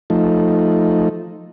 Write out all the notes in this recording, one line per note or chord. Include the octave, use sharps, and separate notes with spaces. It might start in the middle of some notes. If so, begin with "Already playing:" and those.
F3 A3 D#4